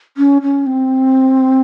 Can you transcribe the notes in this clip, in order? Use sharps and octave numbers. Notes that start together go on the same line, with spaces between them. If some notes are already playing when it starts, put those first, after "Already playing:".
C#4
C#4
C4